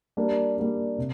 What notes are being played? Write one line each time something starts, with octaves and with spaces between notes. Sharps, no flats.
G3 A#3 D4
G3 A#3 D4
C3